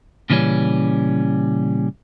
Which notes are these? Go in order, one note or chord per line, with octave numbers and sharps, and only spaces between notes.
A#2 C#3 E3 G3 C#4